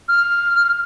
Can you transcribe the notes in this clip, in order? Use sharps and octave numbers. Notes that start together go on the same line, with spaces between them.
F6